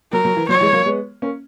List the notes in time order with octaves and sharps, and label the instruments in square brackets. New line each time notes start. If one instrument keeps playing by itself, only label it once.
[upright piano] F#3 [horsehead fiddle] A#4
[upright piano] F#3
E3
[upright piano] F#3 [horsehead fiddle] C#5
[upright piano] E3 G#3
F#3 A#3
G#3 B3
A#3 C#4